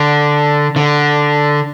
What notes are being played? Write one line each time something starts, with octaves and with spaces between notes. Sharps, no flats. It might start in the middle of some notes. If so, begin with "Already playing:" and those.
Already playing: D3
D3